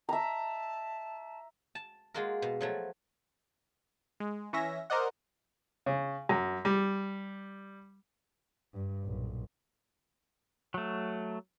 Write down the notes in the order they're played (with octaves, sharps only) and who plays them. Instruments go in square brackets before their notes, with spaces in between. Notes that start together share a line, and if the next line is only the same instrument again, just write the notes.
[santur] E5 A#5 [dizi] A5
[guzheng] A5
G#3 A#3 F4 F#4 A#4
B2
F3 F#3 A3
[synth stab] G#3
E3 C#4 E5 A#6
A#4 C5 D5 D#5 F#5
[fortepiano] C#3
F#2
G3
[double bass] G2
B1 A#2
[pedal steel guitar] F#3 A3